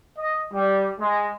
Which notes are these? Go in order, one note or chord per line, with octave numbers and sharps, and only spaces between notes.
D#5
G3
G#3